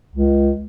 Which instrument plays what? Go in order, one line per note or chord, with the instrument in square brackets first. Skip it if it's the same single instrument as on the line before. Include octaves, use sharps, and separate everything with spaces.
[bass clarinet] C#2